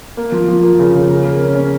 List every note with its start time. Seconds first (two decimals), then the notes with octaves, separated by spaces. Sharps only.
0.17 A#3
0.32 F3
0.48 F3
0.63 A#3
0.79 C#3
0.95 C#3
1.10 A#4
1.24 A#3
1.40 C#4
1.55 C#4